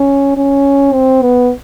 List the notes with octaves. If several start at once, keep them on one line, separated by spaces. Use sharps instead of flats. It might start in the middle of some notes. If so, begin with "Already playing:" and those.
Already playing: C#4
C#4
C4
B3